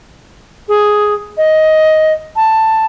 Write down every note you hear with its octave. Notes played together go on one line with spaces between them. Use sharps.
G#4
D#5
A5